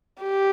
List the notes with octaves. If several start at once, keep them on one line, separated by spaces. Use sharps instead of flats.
G4